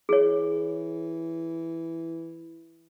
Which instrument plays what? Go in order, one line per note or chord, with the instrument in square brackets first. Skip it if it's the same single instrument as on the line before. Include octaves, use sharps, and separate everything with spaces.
[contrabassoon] E3 [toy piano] G#4 C#5